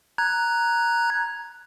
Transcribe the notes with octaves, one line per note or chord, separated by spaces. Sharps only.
A#5 F#6 G#6